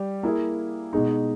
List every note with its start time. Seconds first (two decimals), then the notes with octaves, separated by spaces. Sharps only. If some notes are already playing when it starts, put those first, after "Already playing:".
Already playing: G3 G4
0.23 A#3 E4 G#4
0.93 B2 G#3 D#4